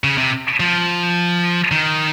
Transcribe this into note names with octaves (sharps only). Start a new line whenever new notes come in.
C#3
C3
F3
D#3